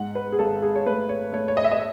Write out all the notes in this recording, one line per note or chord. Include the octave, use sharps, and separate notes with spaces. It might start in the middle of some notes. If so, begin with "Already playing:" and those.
Already playing: G#2 F#5
B4
G#4
G#1 A4
G#4
C#5
A3 B4
C#5
A3 C#5
C#5
D#5
E5
D#5